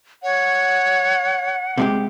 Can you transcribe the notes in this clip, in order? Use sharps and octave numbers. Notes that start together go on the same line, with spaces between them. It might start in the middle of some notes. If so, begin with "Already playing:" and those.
C#5 F#5
C3 G#3 G4